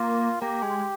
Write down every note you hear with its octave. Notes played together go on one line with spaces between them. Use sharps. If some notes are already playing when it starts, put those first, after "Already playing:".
Already playing: A#3 F4
A#3 G4
G#3